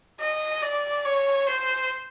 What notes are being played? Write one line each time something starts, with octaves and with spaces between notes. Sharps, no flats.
D#5
D5
C#5
C5